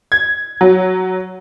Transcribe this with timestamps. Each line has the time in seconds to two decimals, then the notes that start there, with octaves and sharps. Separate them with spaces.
0.12 G#6
0.61 F#3